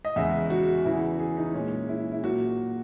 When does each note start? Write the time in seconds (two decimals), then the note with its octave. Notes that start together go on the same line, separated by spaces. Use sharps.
0.05 D#5
0.16 E2 C#3 G#3 E5
0.50 F#4
0.85 E2 C#3 E3 E4
1.19 G#4
1.37 D#4
1.54 A#2 G#3 C#4
1.89 E4
2.12 E4
2.23 A#2 F#3 F#4